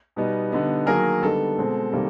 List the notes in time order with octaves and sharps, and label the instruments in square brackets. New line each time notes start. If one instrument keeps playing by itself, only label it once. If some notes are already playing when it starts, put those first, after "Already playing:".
[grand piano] B2 G3 B3 D#4
D3 G3 B3 D#4
D#3 F#3 A#3 G#4 A#4
D3 G3 B3 D#4 A4
B2 G#3 C4
C3 D#3 G3 A#3